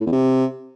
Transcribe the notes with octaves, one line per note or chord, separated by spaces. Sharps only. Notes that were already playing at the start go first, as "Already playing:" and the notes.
A2
E2
C3